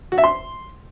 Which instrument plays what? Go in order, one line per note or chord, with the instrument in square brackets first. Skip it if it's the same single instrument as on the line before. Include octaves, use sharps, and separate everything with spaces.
[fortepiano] F#4
E5
C6